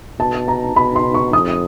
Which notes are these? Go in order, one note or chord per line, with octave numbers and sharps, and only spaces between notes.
B2 A5
A#5
B2 B5
C6
C#6
F2 D#6